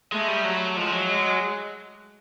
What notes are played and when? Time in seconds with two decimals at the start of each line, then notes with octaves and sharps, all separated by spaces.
0.12 G#3 A3
0.28 G3
0.44 F#3
0.77 F3 G#3
0.93 F#3
1.09 G#3